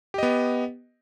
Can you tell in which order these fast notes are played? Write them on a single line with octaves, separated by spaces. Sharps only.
G4 D#5 B3